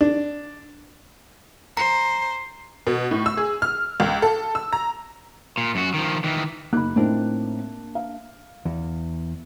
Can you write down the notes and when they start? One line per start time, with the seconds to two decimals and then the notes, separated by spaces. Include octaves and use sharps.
0.01 D4
1.77 C5 A#5
2.87 B2
3.11 A2
3.26 E6
3.37 G#4
3.62 F6
4.00 C#2
4.22 A4
4.55 E6
4.73 A#5
5.57 A#2
5.75 F#2 F#4
5.94 D#3 F3
6.24 D#3 E3
6.73 F#1 A#3 D#4 B5 F#6
6.96 A2 A#3 C4 D4 D#4 A#4
7.95 F5
8.65 E2